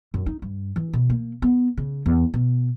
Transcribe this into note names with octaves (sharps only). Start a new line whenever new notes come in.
F#2
D#4
G2
E3
B2
A#3
B3
C#3
E2
B2